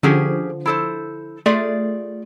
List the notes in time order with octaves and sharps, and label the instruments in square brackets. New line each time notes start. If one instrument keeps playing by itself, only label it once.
[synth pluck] D3 F3 [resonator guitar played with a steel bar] C#4 G4 G#4
[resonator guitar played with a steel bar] E4 A4 C5
[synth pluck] A3 [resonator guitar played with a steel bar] F4 G#4 D5